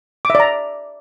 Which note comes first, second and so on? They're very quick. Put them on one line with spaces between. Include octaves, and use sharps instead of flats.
D6 E5 D5 A#5